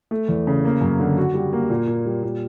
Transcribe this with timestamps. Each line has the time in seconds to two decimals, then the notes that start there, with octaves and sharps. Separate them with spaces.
0.11 A3
0.28 E2
0.47 C#3
0.65 A#3
0.81 F#2
1.00 D3
1.17 F#4
1.34 G3
1.53 A#3
1.70 A#2
1.87 A#2
2.05 G3
2.23 A#2